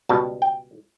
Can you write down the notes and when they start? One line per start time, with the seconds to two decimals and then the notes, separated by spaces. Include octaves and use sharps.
0.09 C#2 B2 G3 A5
0.42 G5